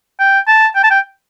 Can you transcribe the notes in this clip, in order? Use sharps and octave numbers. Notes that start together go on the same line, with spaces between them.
G5
A5
G5
A5
G5